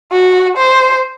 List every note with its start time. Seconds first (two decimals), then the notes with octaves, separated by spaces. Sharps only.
0.12 F#4
0.57 C5